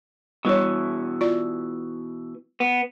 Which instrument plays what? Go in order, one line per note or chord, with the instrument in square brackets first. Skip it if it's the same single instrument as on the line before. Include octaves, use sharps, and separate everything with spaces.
[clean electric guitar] B2 E3 [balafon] G3 C#5
[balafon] F4 D5
[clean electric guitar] B3